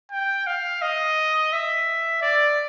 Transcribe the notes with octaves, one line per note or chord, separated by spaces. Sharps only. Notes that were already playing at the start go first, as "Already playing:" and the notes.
G5
F5
D#5
E5
D5